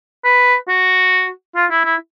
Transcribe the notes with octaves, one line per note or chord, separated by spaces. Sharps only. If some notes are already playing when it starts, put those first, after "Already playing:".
B4
F#4
F4
E4
E4